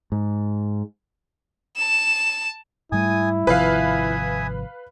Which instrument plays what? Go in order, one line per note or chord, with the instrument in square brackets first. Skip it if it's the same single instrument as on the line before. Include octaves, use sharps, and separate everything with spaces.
[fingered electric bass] G#2
[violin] A5 E7
[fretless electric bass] G#2 G3 A3 [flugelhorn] E4 [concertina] G#5 D#6
[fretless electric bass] G#1 C3 F3 [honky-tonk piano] B4 F5 [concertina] E5 G#5 D#6